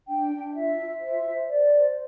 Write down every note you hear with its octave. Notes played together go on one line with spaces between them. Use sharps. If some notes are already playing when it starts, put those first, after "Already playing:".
D4 G5
D4
F4 E5
F4
C5 E5
C5
C5 D5
C5